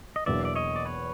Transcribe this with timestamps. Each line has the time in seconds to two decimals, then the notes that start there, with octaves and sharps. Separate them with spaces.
0.16 D#5
0.26 E2 B2 F#3 A#3 D4 D5 E5
0.45 D5
0.55 C#5 D#5
0.76 D5
0.85 B4 C#5